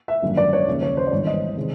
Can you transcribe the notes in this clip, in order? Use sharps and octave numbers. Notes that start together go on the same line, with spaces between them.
E5
G#1 F#2 D3 G3 A#3
D5
C#5
D#2 C#3 F3
C#5
C5
D5
G#1 G2 E3 G3 B3 C#5
D#5
C3 D#3 G#3